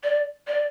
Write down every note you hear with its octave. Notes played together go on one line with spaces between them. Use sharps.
D5
D5